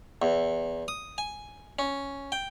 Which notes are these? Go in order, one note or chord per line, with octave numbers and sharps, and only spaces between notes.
E2
D#6
G#5
C#4
G5